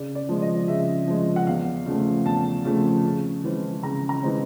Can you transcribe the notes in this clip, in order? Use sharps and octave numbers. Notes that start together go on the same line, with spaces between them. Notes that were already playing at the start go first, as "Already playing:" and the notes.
Already playing: C#3 D5
D5
F3 G#3
D#5
C#3 E5
F3 G#3
F#5
E2 F5
C#3 F3 A3
E2 A5
C#3 F3 A3
C#3
E3 G#3 C4
C#3 A#5
A#5
E3 G#3 C4